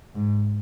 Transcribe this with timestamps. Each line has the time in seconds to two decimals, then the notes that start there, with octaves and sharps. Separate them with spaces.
0.15 G#2